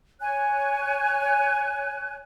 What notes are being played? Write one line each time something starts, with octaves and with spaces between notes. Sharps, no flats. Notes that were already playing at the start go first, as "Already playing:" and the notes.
C#5 G#5 F#6